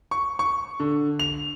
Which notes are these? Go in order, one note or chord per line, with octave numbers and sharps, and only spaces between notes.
C#6
C#6
D3
F7